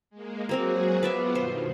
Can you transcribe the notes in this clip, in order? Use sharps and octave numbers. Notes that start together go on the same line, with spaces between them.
G#3 A#3
F#3 A#3 C4 F#4 G#4 A#4
B3 F4 B4 D5 E5
G2 B2 D#3 C5